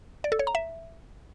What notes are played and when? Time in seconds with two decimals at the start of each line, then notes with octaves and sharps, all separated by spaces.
0.24 D5
0.32 A4
0.39 C#5
0.47 A#5
0.55 E5